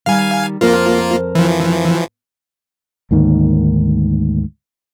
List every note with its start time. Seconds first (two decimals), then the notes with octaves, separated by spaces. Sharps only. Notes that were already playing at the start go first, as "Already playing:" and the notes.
0.06 D#3 G3 F5 G#5
0.61 F2 A#3 F4 A#4 C5
1.35 E3 F3
3.11 D2 G#2 D#3 A#3